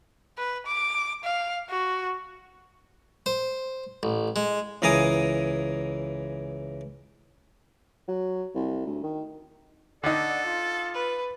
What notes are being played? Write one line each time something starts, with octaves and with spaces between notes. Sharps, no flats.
B4
D6
F5
F#4
C5
A1
G#3
C#2 E3 A#4 F5 G#5 D#6
F#3
C2
D2
D#3
D3 D#4 A4 D5 F#5
F4
B4